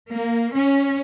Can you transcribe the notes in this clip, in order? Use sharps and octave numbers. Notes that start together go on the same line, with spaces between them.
A#3
C#4